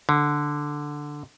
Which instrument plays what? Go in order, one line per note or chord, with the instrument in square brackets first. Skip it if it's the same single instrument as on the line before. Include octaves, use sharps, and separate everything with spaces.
[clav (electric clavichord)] D3